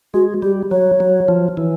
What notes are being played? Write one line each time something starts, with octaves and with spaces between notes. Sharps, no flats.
G#3 F#4
G3 G4
F#3 C#5
F#3
F3
E3